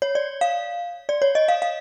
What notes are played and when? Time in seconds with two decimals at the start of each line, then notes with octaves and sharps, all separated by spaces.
0.02 C#5
0.15 D5
0.41 F5
1.09 D5
1.22 C#5
1.35 D#5
1.48 F5
1.62 F5